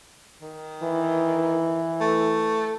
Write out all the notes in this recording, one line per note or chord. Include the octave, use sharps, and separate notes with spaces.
D#3
E3
A3